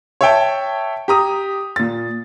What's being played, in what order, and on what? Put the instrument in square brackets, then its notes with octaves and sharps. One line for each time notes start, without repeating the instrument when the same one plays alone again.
[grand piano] C#5 E5 G5 A5
G4 A#5 D#6
A#2 A6